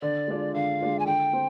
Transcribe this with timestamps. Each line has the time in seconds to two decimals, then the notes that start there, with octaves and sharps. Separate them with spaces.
0.02 D3 D5
0.28 G#3 D4 F4
0.54 D3 F5
0.80 G#3 D4 F4
0.99 G#5
1.06 D3 G5
1.33 C4